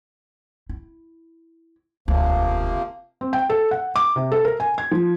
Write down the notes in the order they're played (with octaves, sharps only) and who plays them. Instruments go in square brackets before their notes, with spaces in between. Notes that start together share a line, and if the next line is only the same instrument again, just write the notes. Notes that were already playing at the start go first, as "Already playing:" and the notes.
[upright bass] E4
[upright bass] E1 D2 [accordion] C3 F3 A#3
[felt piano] C4
G5
A4
F#5
D6
C3
A4
A#4
G#5
G#6
F3